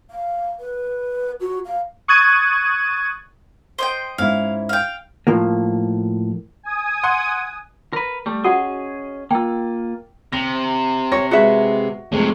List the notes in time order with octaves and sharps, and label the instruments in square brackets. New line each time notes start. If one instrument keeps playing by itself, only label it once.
[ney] F5
B4
F#4
F5
[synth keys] C#6 D#6 F#6 G#6 A6 D#7
[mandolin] C5 D#5 G5
[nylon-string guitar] G#2 C#4 E4 [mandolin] F5
[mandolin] F5 G5
[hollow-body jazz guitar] A2 F3 A#3
[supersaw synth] G#5 D#6
[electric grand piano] F#5 C6 F#6
[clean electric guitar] A#4 B4
G3 A3
[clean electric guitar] C#4 G#4 D#5 [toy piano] F#4 F#5 D#6
[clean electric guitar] A#3 F4 [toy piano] G5 E6
[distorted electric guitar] C3 [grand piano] A#6
[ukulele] C#5 [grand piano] A#6
[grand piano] G#3 G#4 B4 [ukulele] F#4 E5
[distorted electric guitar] F2 C3 [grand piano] G#3 A3